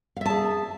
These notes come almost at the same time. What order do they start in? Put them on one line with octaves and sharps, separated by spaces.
F5 E5 A5 G#4